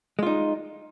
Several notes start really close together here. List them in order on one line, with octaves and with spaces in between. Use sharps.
G#3 F4 D#4